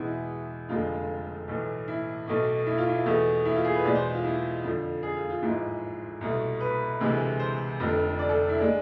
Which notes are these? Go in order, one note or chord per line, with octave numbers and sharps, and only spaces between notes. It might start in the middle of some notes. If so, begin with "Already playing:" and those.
Already playing: E2 B2 G#3 E4
F1 F2 D3 F3 G#3 F4
B1 A2 E3
E4
B1 B2 A3
E4
F4
E4
E2 B2 A3
E4
F4
G#4
B4
E2 B2 G#3 D5
C5
F4
E4
F2 D3 F3
G#4
F4
F4
A1 G#2 F3 G#3 E4
C2 B2 A3
B4
D2 C3 E3 G#3
C5
F1 F2 D3
D5
A4
E4
G#3 D4